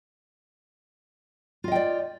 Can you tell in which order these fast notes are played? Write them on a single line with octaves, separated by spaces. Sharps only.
F4 D#5 G5 D5